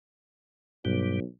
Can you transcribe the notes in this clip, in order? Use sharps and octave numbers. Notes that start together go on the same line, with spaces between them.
B1 G2 B2 G3